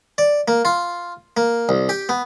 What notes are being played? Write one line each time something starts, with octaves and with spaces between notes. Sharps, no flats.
D5
A#3
F4
A#3
C2
G4
B3